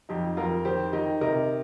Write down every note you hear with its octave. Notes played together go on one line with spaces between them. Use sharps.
F2 D#4 G4
F2 F4 A#4
D#3 G4 C5
D#3 D#4 G4
C3 A#4 D#5